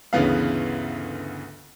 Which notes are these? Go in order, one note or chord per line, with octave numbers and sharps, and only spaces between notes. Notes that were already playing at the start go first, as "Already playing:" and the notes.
G1 D2 C#3 E3 B3 F5